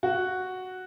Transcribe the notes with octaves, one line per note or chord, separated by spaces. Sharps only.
F#4